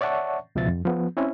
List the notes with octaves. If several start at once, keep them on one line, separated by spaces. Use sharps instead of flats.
C#5 D5 E5 F#5 A5 C#6
C#2 B2 F3 E5 A6
F2
F3 B3
C4 C#4 E4